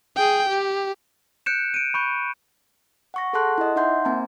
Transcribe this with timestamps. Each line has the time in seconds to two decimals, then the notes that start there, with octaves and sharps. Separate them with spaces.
0.16 G#4 G5
0.50 G4
1.46 F#6 G6 C#7 D7 E7
1.74 D7 D#7
1.94 B5 C#6 G6
3.14 F#5 C#6 A#6
3.33 G#4 A4 F#5 A5 C6 F#6
3.58 E4 D#5
3.76 D#4 E5 F#5 C6 G6
4.05 A#3 C4 G#5 A#5